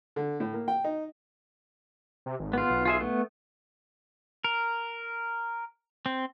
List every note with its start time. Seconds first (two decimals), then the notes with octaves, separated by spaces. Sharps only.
0.16 D3
0.40 A2
0.53 A#3
0.68 G5
0.84 D#4
2.26 C3
2.40 G#1
2.53 B3 F4
2.70 B1
2.85 F4 G#4 E5
3.00 A3 B3
4.44 A#4
6.06 C4